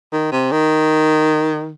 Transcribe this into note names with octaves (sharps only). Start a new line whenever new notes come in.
D#3
C3
D#3